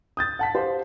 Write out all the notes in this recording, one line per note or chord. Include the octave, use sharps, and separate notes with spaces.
D#6 G6 A6
F#5 A5 B6
G4 C5 F5